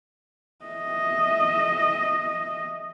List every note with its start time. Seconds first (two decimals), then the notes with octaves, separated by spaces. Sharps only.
0.65 D#5 E5